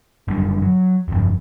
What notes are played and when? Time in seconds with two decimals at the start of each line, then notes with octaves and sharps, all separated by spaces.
0.28 F#1 F#2 D3 G3
0.62 F#3
1.08 G1 F2